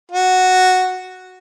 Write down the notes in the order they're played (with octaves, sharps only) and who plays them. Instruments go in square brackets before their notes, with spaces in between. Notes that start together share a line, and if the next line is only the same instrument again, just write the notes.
[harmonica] F#4